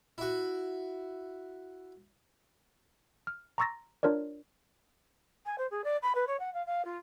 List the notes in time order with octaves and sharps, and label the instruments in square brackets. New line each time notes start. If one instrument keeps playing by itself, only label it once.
[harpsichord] E4 F#4
[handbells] F6
A#5 C6 C#6 E6 A6 A#6
D4 F4 A#4 C#5 D5
[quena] G#5
C5
G#4
D5
B5
B4
C#5
F#5
F5
F5
F4